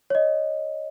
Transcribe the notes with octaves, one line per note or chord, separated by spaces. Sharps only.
C#5 D#5